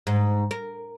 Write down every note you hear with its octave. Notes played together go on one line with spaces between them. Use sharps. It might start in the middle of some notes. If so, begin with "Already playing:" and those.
G#2
A#4